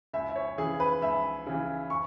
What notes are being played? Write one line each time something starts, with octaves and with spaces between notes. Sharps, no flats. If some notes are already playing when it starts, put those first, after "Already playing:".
C#2 E5
E5
C#5
C#3 E3 G#4
B4
C#2 E5
C#3 E3
C#6